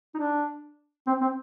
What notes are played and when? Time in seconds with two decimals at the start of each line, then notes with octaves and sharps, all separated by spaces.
0.15 D#4
0.18 D4
1.07 C4
1.21 C4